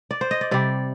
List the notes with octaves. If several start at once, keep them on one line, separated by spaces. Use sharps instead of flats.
D5
C5
D#5
D5
C3 G3 D5